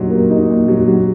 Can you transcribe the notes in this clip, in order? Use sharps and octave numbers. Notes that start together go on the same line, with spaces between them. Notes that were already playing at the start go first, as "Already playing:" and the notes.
Already playing: A#2 F#3 D#4
A#3
D#4
A#2
F#3
F#3